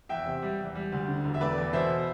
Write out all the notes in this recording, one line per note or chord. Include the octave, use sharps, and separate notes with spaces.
E2 E5 G5
C3
G3
E2
G3
D2
D3
E1
E5
A3 B4 D5
E2
B2 C5 E5